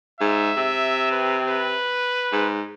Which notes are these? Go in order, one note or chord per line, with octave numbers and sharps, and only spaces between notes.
G#2 E5
C3
B4
B4
G#2